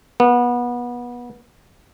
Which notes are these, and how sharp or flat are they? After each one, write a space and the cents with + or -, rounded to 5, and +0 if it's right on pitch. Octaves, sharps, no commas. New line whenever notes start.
B3 -25